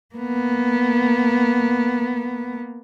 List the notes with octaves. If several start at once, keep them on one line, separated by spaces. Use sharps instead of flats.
A#3 B3